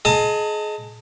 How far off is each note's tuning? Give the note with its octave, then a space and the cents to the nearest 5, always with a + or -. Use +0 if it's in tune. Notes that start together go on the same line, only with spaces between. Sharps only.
G#4 +30 D#5 +0 A5 +35